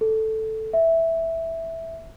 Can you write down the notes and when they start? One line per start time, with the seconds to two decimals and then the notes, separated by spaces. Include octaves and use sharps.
0.01 A4
0.73 E5